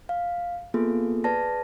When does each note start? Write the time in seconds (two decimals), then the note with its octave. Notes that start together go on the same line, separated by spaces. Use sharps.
0.09 F5
0.74 A#3 B3 F4 G#4 A4
1.24 G#4 B4 D5 A5 A#6